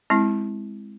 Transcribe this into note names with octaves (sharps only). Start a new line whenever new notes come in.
G#3 C4 E4